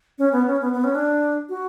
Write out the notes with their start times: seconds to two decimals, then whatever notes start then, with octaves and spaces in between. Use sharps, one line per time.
0.19 C#4
0.32 B3
0.47 C#4
0.61 B3
0.73 B3
0.84 C#4
0.95 D4
1.49 F#4